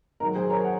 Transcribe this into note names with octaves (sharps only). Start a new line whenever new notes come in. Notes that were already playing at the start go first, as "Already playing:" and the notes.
G#2 D#3 F#3 A#4
G#4 C5
A#4 C#5
F#5